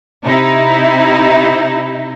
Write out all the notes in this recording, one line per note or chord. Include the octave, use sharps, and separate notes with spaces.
C3 D#4 E4